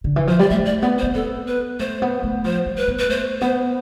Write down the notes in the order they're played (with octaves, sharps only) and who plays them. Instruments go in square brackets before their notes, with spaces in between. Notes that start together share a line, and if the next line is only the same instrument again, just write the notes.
[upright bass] D3
E3
[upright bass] F3 [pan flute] C5
[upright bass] G3 [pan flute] D5
[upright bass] A3 [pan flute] E5
[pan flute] D5
[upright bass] B3 [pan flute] D5
[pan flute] C5
[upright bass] C4
[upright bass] B3 [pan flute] A4
[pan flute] B4
[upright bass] A3 [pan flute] C5
[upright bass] B3
A3
[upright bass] F3 [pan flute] C5
[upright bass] G3
[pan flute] B4
[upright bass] B3
[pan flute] B4
[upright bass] A3 [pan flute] C5
[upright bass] B3 [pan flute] C5